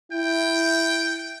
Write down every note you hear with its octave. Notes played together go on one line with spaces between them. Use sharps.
E4 G5